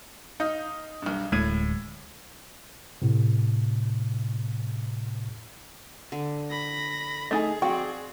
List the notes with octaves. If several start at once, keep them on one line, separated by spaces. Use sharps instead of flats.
D#4 F5 G6
B1 G2
D1 A2 G#3 G#6 D#7
A2 C3
D3
B5 A#6
A3 D#4 G#4 D#5 G#5
C4 F#4 D5 F5 G5 C#6